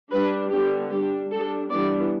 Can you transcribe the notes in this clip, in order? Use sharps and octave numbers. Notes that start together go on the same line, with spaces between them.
G3 D4 B4
D3 G3 B3 D4 G4
G3 D4 G4
G3 D4 A4
E3 G3 B3 D4 D5